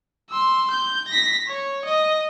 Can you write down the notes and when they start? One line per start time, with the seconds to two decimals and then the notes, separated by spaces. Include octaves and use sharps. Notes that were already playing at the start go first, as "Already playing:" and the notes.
0.30 C6 E6
0.70 G6
1.08 A#6 B6
1.47 C#5
1.85 D#5